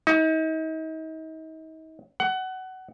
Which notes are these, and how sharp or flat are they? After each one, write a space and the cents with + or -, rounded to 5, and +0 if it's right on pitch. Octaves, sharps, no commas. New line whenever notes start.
D#4 +40
F#5 +20